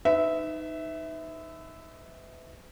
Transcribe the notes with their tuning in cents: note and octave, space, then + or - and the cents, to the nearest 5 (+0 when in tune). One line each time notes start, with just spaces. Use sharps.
D#4 +0 B4 +35 E5 -10